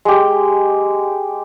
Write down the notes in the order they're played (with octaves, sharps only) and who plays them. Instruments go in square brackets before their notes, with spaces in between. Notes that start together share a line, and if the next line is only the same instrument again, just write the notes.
[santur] G#3 G4